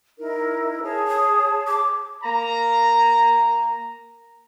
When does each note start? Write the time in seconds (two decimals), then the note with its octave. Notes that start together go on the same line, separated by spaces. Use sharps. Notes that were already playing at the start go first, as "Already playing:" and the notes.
0.18 D#4 E4 A#4
0.83 G#4 C#5 A5
1.08 D#6
1.68 D6
2.24 A#3 A#5